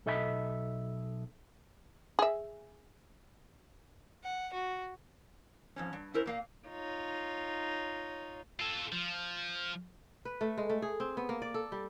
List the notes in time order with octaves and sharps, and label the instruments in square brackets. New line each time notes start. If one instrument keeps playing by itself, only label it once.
[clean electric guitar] B1 A4 D#5 E5 G5 B5
[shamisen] G#4 E5
[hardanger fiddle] F#5
F#4
[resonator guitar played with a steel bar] F2 G#2 C#4
G2
C#4 E4 A#4 C5
A#2 A#3 F5
[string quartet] D#4 F4 C#5
[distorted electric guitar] F4 A4
F3
[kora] B4
A3
G#3
A3
G#4
C4
B3
A#3
D5
A4
G3